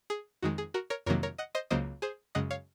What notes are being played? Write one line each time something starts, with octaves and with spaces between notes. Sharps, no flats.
G#4
F2 D#3 G#3 F#4
G#4
F#4 A#4
A#4 C#5
F2 C3 D#3 F#3 A#3 A#4 C#5
A#4 C#5
D#5 F#5
C5 D#5
C#2 C#3 F#3 A#3 C5 D#5
G#4 C5
F#2 C#3 G#3 D#5 F#5
C#5 F5